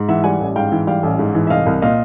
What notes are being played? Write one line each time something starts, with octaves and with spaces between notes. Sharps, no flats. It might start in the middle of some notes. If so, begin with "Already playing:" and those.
Already playing: G#2
E3 E5 F#5
G3 F#5 G#5
A1
G#2 F5 G5
E3
G3 F5 G5
A1
G#2
E3
E5
C2 D#5 F5
C2
A#2 D#5 F5